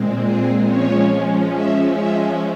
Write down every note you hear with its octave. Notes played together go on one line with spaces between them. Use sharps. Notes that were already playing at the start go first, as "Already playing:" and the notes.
Already playing: A#2 G#3 C4
G#4
F3 G#3 C#4 C#5
E5
E5